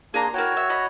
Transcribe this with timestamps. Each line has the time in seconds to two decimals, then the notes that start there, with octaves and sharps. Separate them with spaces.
0.14 A#3 D4 G#4 A#5 C6
0.34 A#3 E4 F#4 C#5 G5
0.57 E5
0.69 D#5 B5